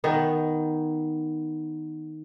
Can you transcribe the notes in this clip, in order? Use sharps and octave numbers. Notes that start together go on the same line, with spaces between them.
D#3 B3